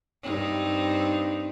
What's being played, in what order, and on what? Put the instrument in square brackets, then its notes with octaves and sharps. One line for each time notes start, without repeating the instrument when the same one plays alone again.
[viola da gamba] G2 C4 D#4